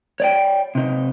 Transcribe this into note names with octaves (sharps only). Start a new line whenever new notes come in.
C#5 D5 G5
C3 D#4